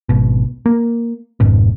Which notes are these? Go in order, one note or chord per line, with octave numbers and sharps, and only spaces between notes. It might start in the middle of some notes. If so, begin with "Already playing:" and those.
G#1 B2
A#3
G#1 F2 G#2 B2